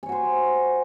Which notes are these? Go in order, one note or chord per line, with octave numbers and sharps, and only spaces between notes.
F#4 C5 C#5 G#5